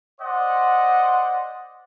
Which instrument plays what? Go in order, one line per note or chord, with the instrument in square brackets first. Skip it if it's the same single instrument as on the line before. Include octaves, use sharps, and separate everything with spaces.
[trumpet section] C5 D5 D#5 F#5 C6